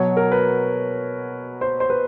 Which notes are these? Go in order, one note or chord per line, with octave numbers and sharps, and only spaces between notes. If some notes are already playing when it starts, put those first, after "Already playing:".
Already playing: B2 F#3 C#5
A#4
B4
C5
C5
B4